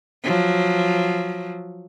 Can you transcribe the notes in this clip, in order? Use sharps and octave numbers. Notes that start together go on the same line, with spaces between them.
F3 F#3